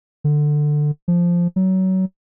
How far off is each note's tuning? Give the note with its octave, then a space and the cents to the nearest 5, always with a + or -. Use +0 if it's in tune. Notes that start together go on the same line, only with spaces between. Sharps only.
D3 +15
F3 -5
F#3 +25